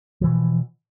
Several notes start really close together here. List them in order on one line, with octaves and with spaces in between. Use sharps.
F3 E3 B2